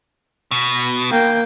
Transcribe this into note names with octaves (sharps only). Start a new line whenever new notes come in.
B2
A#3 G5